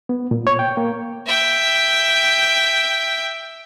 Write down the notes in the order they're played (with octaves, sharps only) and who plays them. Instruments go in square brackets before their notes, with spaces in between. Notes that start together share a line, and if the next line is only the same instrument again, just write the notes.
[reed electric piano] B3
A#2
C#5
G5
A#3
[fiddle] E5 G5